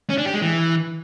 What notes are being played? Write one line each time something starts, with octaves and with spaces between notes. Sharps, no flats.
C#4
D4
G4
G#3
E3